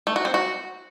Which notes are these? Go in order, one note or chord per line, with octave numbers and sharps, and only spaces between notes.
A3
F#4
C4
F#4